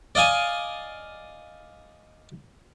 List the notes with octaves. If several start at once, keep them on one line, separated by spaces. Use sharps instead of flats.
D5 D#5 F5 G#5